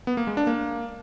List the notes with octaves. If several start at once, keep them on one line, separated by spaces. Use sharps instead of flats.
B3
A#3
G#3
D4
A#3